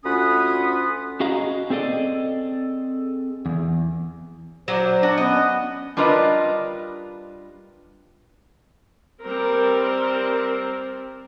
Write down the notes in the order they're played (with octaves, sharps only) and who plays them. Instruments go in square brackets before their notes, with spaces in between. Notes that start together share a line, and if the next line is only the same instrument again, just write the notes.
[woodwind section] D2 C#4 F4 F#5 B5 D#6
[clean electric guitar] C#4 F#4 G#4 D#5 F5 A#5
C4 G#4 A4 D5 D#5
E2
[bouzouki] F#3 D4 [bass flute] C5
[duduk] D4 [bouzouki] F#4
[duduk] B3 [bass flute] C#4 [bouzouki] D#5
[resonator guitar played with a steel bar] G3 D4 F4 A#4 B4 D#5
[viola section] G3 C4 A#4